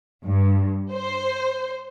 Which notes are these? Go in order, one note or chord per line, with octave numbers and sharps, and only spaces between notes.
G2
C5